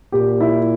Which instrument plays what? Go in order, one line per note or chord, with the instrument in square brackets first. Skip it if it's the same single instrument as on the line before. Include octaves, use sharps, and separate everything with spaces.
[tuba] A#2 [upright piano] G4
[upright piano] E4